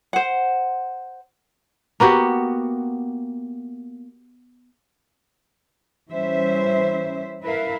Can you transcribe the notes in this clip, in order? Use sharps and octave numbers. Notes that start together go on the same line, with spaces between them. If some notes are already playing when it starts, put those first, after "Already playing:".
C5 F#5
A#3 B3 F#4 G4
E3 G3 C#4 C5 E5
E4 A#4 B4 E5 F5